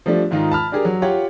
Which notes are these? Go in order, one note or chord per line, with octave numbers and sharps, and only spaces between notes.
F3 G3 A3 D4
G#2 D#3 D#4 F4
A5 B5 F6
D4 G4 G#4 A#4
F#3
F4 G4 C#5 F#5